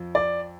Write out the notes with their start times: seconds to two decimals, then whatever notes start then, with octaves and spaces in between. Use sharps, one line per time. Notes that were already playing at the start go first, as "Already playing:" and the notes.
Already playing: F2 F3
0.15 D5